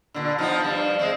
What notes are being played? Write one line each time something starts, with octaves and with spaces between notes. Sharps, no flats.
A#2 D3
F3 B3 D#4
G2 F3
G#3 C4